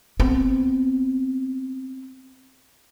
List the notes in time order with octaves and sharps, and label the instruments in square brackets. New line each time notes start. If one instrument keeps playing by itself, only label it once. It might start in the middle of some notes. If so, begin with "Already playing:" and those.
[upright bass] B3 C4